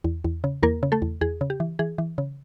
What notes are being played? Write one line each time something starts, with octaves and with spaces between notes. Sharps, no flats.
E2
E2
C#3
E2 A#3 A#4
C#3
A3 A4
E2
E2 G#4
C#3
G4
E3
E3 G#4
E3
C#3